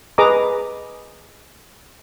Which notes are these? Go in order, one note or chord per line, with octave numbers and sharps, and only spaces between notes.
G#4 B4 D#5 A#5 D6 D#6